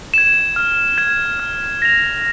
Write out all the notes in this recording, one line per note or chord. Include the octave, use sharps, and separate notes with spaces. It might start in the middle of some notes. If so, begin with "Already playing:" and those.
G#6 E7
F6
G#6 E7
F6
A#6 F7